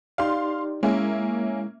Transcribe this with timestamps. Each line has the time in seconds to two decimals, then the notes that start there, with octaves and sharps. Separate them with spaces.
0.18 D#4 G4 D5 F5 C6
0.83 G#3 A#3 C#4 E4 E5